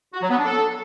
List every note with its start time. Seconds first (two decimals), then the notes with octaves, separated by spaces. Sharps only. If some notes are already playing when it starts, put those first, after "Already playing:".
0.13 F#4
0.22 F#3
0.30 B3
0.38 D4
0.46 A4